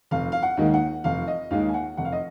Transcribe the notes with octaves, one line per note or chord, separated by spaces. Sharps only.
F1 F5
F5
F#5
D#2 D#3 G#3
F#5
F1 F5
D#5
D#2 D#3 G#3 F5
G#5
F#5
F1 F#5
F5
D#5